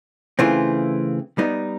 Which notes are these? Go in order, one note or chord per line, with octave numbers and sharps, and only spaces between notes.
C#3 E3 A3 C4 F4
G3 B3 D#4